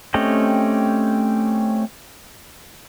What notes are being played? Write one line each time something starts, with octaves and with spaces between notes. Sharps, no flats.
A3 C4 C#4 G4 D#5